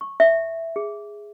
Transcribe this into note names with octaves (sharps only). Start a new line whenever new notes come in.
C#6
E5
G#4